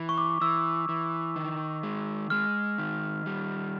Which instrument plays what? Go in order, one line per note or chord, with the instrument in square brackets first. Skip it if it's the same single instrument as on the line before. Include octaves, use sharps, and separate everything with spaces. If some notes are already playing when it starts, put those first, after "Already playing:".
Already playing: [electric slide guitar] E3
[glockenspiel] C#6
D6
[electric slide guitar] E3 [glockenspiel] E6
[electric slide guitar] E3
D#3
G#3
[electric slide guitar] G#3 [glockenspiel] F6
[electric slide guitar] D#3
G3